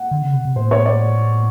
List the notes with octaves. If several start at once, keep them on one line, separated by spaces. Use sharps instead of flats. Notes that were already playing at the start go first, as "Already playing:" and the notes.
Already playing: F#5
D3
C#3
C3
C3
A2 C5
C#5
D5